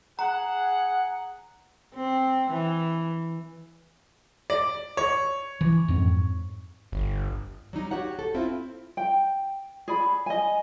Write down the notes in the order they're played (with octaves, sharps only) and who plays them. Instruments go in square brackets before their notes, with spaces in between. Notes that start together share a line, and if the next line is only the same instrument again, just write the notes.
[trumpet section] G#4 F#5 [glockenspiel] A#5
[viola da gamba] C4
E3
[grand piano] D5
C#5
[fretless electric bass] E3
F2 G#2 C4
[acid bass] G1
[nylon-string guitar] F#3 G3 D#4
F#4 G4 C#5 F#5
A4
C4 E4 F4
[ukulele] G5
G#4 D5 B5
D#5 G#5